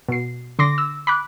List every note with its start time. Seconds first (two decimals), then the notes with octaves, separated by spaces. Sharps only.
0.09 B2 C7
0.59 D3 C6 D6 A#6
0.78 E6
1.07 B5 D6 F#6